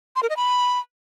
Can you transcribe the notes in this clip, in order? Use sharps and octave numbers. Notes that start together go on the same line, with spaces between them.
C6
A#4
D#5
B5